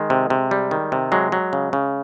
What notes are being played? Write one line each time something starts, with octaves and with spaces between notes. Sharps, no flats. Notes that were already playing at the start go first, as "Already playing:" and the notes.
Already playing: D#3 G#3
C3
C3
G3
D#3
C3
F#3 G#3
F#3
C#3
C#3